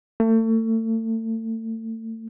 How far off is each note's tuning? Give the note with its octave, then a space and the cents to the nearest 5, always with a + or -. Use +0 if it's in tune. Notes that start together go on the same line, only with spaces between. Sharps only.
A3 +35